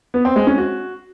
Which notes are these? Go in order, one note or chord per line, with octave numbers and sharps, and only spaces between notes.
B3
C4
G#3
C#4
F#4